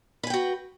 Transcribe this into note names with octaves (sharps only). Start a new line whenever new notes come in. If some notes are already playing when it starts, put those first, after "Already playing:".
F#4 B4 G5 G#5